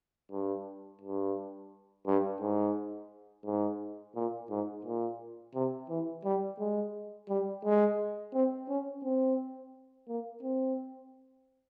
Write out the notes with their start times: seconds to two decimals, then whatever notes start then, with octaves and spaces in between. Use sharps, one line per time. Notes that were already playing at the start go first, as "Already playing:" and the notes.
0.31 G2
1.02 G2
2.07 G2
2.41 G#2
3.45 G#2
4.15 A#2
4.50 G#2
4.85 A#2
5.55 C3
5.89 E3
6.24 G3
6.59 G#3
7.29 G3
7.64 G#3
8.33 C4
8.68 C#4
9.03 C4
10.08 A#3
10.42 C4